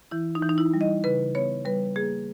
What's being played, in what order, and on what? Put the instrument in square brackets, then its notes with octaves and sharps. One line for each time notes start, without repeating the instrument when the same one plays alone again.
[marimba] E3 E4
D#4
E3
D#4
E4
G3
D#5
C#3 B4
B3 C#5
G3 B4
A#3 G#4